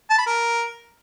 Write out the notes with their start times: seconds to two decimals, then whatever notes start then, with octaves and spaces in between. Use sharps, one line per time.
0.10 A5
0.18 B5
0.26 A#4